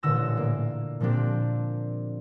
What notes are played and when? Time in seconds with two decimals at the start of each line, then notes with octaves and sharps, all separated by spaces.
0.03 A1 A#2 D3 E6 A#6
0.37 A#3
1.00 A#2 F3 A#3 C4 D4 G4